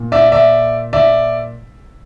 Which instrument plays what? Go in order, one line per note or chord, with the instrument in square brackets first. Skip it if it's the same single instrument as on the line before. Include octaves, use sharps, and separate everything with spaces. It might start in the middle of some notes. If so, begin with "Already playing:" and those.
Already playing: [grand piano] A#2
D5 E5
D5 E5
D5 E5